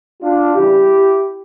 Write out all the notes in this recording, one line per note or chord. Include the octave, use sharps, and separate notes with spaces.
D4 F4
C#3 E3 G3 E4 G4